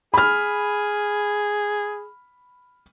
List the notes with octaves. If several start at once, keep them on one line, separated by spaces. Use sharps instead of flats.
G#4 B5 F6